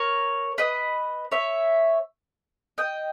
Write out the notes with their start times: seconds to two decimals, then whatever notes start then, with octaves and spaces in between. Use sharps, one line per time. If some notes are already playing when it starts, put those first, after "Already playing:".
Already playing: A#4 C#5
0.58 B4 D#5
1.32 C#5 E5
2.78 D#5 G5